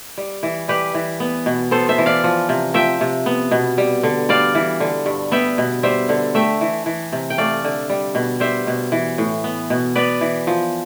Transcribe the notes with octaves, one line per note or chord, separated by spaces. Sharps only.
G3
E3
G3 G4 B4
E3
B3
B2
B3 A4 C5
C5 E5
E3
D5 F5
F3
C3
F3 E5 G5
C3
B3
B2
G3
D3
G3 D5 F5
E3
D3
G2
B3 E5 G5
B2
G3 C5 E5
D3
A3 E5 G5
E3
E3
C3
G5
A3 D5 F5
D3
G3
B2
G3 C5 E5
B2
E3
A2
B3
B2
B3 B4 D5
E3
F3